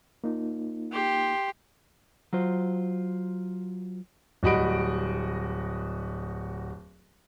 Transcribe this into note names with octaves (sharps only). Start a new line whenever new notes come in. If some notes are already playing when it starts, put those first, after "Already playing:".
A#3 D#4 F4
G4 C6
F#3 F4 C5
D1 G3 F#4 D#5 B5 D7